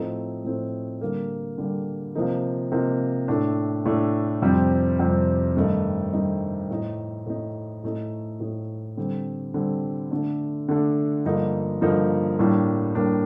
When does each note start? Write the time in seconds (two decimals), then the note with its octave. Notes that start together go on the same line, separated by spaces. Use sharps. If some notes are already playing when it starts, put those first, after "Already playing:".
Already playing: A2 F3 A3 C4 D#4
0.44 A2 F3 A3 C4 D#4
1.01 D3 G3 A#3
1.58 D3 G3 A#3
2.15 C3 F3 A#3 D#4
2.72 C3 F3 A#3 D#4
3.28 A2 A3 D4
3.85 A2 A3 D4
4.42 F2 C3 G3 C4
4.99 F2 C3 G3 C4
5.56 G2 D#3 A3 D#4
6.13 G2 D#3 A3 D#4
6.70 A2 A3 D#4
7.26 A2 A3 D#4
7.83 A2 A3 D#4
8.40 A2 A3 D#4
8.97 D3 G3 C4
9.54 D3 G3 C4
10.11 D3 A3 D4
10.69 D3 A3 D4
11.25 G2 D3 F3 A#3 D#4
11.81 G2 D3 F3 A#3 D#4
12.39 A2 G3 A#3 D4
12.95 A2 G3 A#3 D4